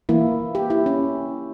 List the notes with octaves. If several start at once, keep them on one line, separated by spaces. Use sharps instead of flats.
E3 A#3 E4
G4
E4
C#4